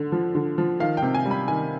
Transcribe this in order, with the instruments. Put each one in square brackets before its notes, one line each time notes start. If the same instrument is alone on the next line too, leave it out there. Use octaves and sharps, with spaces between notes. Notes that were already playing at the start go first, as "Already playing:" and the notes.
Already playing: [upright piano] D3
F3
D3
F3
D#3 F5
G5
C3
G#5
G3
B5
D#3 G#5